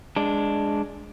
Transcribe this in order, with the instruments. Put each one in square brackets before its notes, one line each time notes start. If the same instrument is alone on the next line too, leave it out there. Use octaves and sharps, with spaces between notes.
[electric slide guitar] G#3 D4